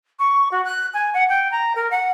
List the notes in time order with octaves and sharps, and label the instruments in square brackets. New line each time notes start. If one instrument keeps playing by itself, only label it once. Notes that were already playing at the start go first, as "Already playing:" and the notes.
[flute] C#6
F#4
F#6
G#5
F#5
G5
A#5
A#4
F#5